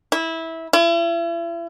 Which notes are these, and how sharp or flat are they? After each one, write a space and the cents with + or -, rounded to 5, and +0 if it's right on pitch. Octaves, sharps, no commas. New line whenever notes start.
E4 -15
E4 +40